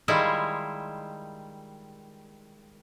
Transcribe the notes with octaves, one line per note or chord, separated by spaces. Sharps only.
D#3 G3 G#3 E4 F4